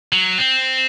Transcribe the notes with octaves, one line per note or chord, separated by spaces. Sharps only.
F#3
C4